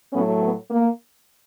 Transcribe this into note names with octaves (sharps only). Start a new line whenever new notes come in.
A2 F#3 A3 B3 C#4
B3
A#3